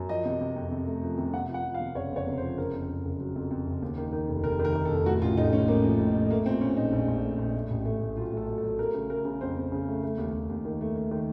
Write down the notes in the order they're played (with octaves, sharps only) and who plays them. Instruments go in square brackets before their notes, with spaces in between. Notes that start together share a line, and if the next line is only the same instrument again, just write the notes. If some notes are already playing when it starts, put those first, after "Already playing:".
Already playing: [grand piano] F#2
F3 D#5
C3
C3
F2
C3
A3
F3
C3
C3 F#5
F3 F#5
F3
F5
C3
F#1 C#5
F2 C#5
C3
C5
F3
F#1 A#4
F2
F#1
F#1
F#3
F2
F2
F#1
D#2
D#3
D#3
F1
F1 A#4
D#3
A#4
D#3
A4
F1
A2 F#4
A1 F4
A1 D#4
A2 C#4
A2 A#3
F3
A2
A2
A3 A#3
A#2 C4
A#2 C#4
A#1 D#4
A#1
A#1
A3
A#1
A3
A1
A3
A2
F#3 F4
A3 A4
F#3
A4
F#3
A3 A#4
C#3
A3 A#4
C#3
F2 C5
F2
C#3
A3
A3
D#2
D#2
D#2
D#3
A3
A3
D#3